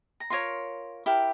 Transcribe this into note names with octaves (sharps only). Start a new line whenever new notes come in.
A#5
F4 A#4 C#5 C6
E4 G4 A#4